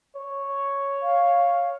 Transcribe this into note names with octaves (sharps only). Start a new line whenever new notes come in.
C#5
F5